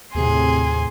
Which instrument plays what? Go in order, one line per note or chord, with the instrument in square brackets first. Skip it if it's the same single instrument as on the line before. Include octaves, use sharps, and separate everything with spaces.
[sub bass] D#2 [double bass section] A2 C3 [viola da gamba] G#4 [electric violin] G#5 C6